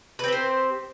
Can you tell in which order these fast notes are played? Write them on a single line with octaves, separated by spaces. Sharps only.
B4 C4 G4 C5